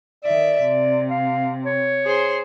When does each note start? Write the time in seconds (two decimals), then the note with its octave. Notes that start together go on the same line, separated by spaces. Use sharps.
0.24 D#3 D5 E5
0.64 C3
1.10 F5
1.65 C#5
2.04 G#4 C5 C6